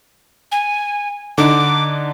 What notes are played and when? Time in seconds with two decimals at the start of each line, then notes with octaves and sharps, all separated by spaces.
0.52 G#5
1.38 D3 D4 D#4 D6